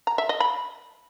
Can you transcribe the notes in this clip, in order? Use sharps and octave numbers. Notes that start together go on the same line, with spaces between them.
A#5
E5
D#5
B5